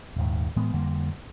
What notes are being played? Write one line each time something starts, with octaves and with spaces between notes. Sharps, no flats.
D#1 D#2 G#2
A2 E3 G#3 B3
F2 D3 G3 A#3